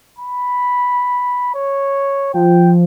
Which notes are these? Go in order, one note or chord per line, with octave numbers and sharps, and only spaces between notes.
B5
C#5
F3 G5